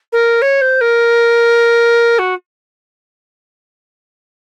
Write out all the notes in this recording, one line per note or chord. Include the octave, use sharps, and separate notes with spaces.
A#4
C#5
C5
A#4
F#4